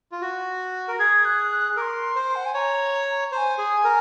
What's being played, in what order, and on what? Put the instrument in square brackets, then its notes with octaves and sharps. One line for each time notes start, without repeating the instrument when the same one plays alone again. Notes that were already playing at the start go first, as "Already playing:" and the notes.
[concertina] F4
F#4
A#4
[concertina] G#4 [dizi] G#6
[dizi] F#6
F#6
[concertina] A#4 [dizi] D6
[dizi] C6
[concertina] C5
[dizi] F#5
G#5
[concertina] C#5 [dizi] A#5
[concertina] C5 [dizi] A#5
[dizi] G#5
[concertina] G#4
A#4